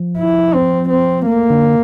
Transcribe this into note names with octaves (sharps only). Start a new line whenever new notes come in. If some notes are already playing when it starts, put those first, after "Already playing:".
Already playing: F3
E4
C4
C4
A3 A#3
D3